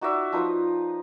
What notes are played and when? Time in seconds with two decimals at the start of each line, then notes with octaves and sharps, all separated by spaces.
0.01 D#4 F#4 D5 E5
0.32 F3 D#4 B4 D#6